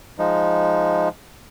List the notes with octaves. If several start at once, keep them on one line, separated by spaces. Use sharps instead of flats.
F3 G#3 D#4